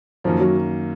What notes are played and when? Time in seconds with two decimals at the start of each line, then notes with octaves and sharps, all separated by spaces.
0.24 F#2 D#3 F3 A#3
0.40 F#3